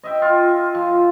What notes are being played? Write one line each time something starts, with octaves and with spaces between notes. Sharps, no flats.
D#5 E5 G5
F4
F3